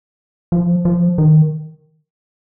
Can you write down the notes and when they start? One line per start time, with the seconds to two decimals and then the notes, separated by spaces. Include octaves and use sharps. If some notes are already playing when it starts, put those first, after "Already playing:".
0.52 F3
0.85 F3
1.18 D#3